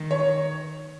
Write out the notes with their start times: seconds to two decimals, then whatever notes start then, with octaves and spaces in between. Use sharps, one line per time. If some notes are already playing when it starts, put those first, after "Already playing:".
Already playing: D#3
0.11 C#5